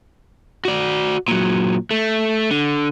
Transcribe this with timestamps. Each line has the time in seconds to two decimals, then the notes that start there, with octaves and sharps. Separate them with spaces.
0.65 F#4 D5
1.28 A#2 F#3
1.91 A3
2.51 D3